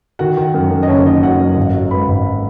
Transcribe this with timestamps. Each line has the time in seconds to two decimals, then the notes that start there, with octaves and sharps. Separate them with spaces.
0.19 D#3 F#4 F#5
0.37 D#3
0.54 F#2
0.71 F#2
0.83 D#5
0.88 F#1 C#4 C#5
1.05 D#3 D#4 D#5
1.23 F#1 F#4 F#5
1.40 F#2
1.57 G#1
1.74 F#3
1.91 G#2 B4 B5
2.08 G#1